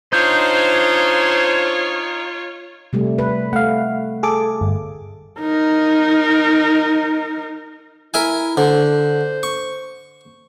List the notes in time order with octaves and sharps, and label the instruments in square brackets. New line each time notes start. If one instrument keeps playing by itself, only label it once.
[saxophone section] D4 C5 [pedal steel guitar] D#4 G6 [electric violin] F4 C#5
[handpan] C3 G3 A3
B4
[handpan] A3 [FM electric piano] F5 F#5
[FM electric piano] G#4 A4 D6
G1
[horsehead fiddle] D#4 A#4
[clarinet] E4 [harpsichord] A#4 E5 G#5
[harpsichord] D3 [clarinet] C5
[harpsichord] C#6